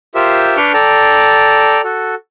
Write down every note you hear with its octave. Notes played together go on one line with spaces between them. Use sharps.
F4 G4 A#4 C5 E5
D4 B4 C#6 D6 F6 G6
A4 D5 G5 A5 A#5
F#4 A4